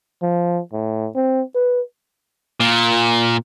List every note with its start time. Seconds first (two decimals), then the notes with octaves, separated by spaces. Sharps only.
0.22 F3
0.73 A2
1.15 C4
1.55 B4
2.60 A#2